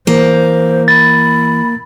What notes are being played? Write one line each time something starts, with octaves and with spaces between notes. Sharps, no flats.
E3 A#3 C5
B5 A6